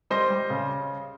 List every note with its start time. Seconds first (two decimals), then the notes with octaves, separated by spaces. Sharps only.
0.10 G3 C5 D#5
0.31 G3
0.50 C#3